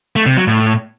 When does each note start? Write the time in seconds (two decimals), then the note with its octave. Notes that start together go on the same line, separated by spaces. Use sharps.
0.16 A3
0.26 C3
0.37 F#3
0.47 A2